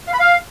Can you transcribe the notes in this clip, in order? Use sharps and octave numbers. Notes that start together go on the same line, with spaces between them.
F5
B5
F5